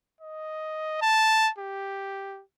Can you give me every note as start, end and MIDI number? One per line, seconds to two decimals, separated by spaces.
0.21 1.00 75
1.01 1.49 81
1.58 2.41 67